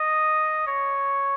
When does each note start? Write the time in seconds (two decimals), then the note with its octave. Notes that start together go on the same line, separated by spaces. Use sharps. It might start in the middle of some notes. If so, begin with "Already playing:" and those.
Already playing: D#5
0.67 C#5